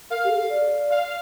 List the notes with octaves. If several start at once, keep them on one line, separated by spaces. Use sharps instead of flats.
A#4 F5
G4
A4
D5
F5